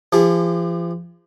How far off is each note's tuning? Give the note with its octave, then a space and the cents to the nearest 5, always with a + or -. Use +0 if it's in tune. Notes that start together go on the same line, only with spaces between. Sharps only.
F3 -40 G4 +45